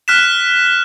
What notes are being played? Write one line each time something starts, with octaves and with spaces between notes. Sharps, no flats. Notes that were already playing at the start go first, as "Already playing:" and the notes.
F6 F#6 B6 E7